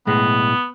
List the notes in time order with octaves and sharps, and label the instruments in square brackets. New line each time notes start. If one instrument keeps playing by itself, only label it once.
[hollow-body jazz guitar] B1 A2 G#3 [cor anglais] B3